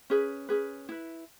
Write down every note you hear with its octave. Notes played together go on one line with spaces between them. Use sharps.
C#4 G#4 B4
C#4 G#4 B4
E4 B4